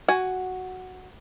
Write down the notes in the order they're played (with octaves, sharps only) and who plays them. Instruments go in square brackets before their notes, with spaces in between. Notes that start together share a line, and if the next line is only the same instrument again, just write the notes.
[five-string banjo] F#4 G#5